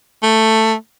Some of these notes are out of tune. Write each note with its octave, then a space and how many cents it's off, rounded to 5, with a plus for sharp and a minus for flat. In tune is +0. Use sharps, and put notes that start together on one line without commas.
A3 +10